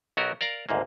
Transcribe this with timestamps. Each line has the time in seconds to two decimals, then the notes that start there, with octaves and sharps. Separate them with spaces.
0.17 B1 F#3 B3 F#4 G4 A#4
0.41 A#4 D5 F5 A#5
0.69 G#1 D2 G#2 A#3